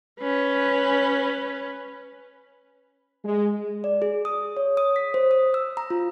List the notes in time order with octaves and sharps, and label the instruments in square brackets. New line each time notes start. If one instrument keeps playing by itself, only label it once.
[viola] C#4 B4
[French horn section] G#3
[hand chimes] D5
G#4
D#6
C#5
D#6
B6
C5
D#6
E6
A#5
F4